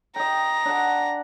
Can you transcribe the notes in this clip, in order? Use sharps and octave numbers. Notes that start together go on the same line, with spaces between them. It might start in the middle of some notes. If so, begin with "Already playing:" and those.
D#5 G5 A#5
D4 F#5